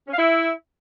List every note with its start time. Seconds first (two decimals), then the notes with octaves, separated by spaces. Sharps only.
0.07 C#4
0.13 F5
0.18 E4